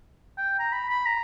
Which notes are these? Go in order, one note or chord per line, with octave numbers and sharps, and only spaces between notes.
G5
A#5
B5
B5
A#5